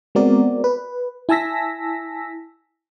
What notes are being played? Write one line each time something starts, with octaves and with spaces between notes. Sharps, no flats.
G#3 B3 C4 F#4 A#4 D5
B4
E4 G#5 A5 E6 A#6 B6